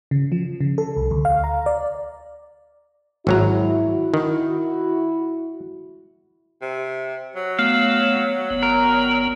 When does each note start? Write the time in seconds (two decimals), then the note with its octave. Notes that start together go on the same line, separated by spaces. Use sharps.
0.11 C#3
0.32 F3
0.60 C#3
0.78 A4
0.97 C2
1.11 D2
1.25 F5
1.44 A#5
1.66 D5
3.27 G#1 F#3 E4 F#4 A#5
4.14 D#3
6.62 C3
7.36 F#3
7.59 A3 B3 F5
8.50 G1 B3
8.63 A#4